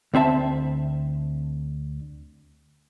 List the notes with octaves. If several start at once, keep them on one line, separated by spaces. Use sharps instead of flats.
D2 C4 E5 A5